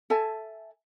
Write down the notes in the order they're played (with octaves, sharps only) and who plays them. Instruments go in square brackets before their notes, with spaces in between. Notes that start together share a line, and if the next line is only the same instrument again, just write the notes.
[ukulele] A4 E5 G#5 A5